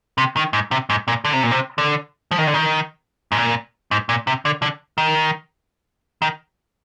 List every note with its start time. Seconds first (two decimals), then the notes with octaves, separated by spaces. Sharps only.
0.18 C3
0.37 D#3
0.53 G#2
0.71 C3
0.90 G#2
1.08 A#2
1.25 D3
1.33 C3
1.43 A#2
1.51 C3
1.78 D3
2.31 F3
2.38 D#3
2.47 D3
2.54 D#3
3.32 G#2
3.38 A#2
3.91 G#2
4.09 A#2
4.27 C3
4.45 D3
4.62 D3
4.98 D#3
6.22 D#3